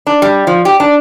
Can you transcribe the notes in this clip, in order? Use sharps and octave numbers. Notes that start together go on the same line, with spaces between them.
D4
G3
F3
G4
D4